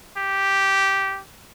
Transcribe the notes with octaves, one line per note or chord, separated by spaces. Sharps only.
G4